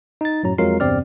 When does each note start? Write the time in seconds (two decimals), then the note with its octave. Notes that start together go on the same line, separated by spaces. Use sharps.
0.21 D#4 A6
0.43 F#2 A2 F#3 A#5
0.58 F2 F#3 G#3 F4 A#4 C7
0.80 E2 G2 C3 C4 D5 F6